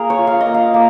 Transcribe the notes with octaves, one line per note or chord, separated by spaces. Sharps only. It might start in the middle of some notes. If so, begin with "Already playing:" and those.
Already playing: A#3 G#4 A#4
C#5
F4
F5
D#5
A#3
F5
A#3